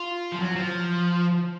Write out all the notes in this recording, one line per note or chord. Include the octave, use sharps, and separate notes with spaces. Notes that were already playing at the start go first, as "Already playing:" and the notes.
Already playing: F4
F3
F#3
F3